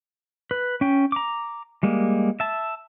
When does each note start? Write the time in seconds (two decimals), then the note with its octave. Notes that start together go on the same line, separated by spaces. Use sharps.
0.51 B4
0.81 C#4 G5
1.12 A#5 D6
1.83 G3 G#3 A#3
2.40 E5 A5